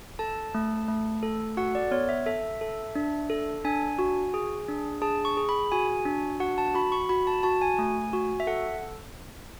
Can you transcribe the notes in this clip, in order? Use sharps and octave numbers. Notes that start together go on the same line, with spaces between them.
A4 A5
A3
A3
A4
F#4 F#5
D5
B3 C#5
E5
A4 E5
A4
D4
A4
D4 G#5
F#4
G#4
D4
G#4 A5
C#6
G#4
B5
F#4 G#5
D4
F#4 F#5
A5
F#4 B5
C#6
F#4 B5
A5
F#4 A5
G#5
A3
F#4
E5
A4 F#5